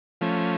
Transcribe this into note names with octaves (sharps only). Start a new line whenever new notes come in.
F3 A3 C#4